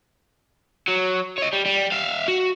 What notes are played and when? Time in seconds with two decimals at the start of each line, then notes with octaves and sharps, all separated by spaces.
0.88 F#3
1.38 C#5 D#5
1.53 G3
1.66 G3
1.92 E5 F5
2.28 F#4